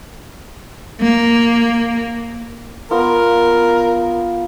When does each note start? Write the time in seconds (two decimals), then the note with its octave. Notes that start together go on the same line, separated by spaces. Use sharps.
1.02 A#3
2.91 B3 F4 A#4